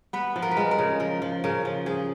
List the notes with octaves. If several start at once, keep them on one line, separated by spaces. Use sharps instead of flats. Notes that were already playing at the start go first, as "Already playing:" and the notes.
B3 B4
F3
A#4
B4
G#3 A#4
A#4
C#3
F3 A#4
F3
C#3 A#4
F3
F3 G#4